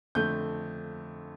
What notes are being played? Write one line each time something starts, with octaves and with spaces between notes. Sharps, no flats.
F2 D3 A3 G6